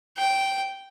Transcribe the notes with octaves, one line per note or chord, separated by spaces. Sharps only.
G5